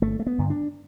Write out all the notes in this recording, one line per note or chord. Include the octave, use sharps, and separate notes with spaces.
G1 A3
A3
B3
G2 D3
D4